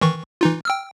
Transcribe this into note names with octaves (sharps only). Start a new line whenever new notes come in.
D#3 E3 C#6
E3 D#4 F4
G5 E6 F6